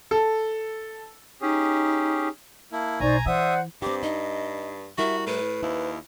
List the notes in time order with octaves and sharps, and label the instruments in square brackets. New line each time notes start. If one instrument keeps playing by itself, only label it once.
[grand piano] A4
[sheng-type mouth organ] C#4 G4 G#4 [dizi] D#4
[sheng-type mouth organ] A#3 E4 [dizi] A5
[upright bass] B1 [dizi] D#4 [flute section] C5 D5 C#6 [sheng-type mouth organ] G#5 A#5
[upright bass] E3 [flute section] C5 F#5 [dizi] D5 [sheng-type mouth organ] E5 D#6
[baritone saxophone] G2 [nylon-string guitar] C4 G4 [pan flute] D6
[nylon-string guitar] D#4 [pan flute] D#5
[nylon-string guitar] G3 E4 A#4 [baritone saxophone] F#4 [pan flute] E5
[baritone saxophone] A2 [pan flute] B4
[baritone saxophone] D#2 [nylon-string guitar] E4